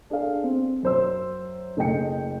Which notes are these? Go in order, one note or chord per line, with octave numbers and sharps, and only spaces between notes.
D4 G#4 A4 F5
C4
F#2 C5 E6
F#1 A3 G#4 D#5 G5 C#7